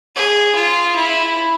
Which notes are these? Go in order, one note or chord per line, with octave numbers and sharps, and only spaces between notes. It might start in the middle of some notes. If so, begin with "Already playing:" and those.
G#4
F4
E4